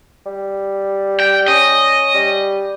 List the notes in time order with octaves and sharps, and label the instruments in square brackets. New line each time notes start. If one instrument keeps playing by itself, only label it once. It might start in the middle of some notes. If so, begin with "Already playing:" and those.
[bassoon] G3
[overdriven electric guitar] G5
[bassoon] C#4 [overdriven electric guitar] D#5
[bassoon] G3